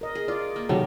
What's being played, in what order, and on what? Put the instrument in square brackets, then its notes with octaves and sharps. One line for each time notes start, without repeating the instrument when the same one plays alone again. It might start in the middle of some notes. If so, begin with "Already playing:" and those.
[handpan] A#4 D#5
[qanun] G#4
[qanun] F4 [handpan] D5
[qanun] A#3
[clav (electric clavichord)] C3 F#3 A4 [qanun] D#3 G3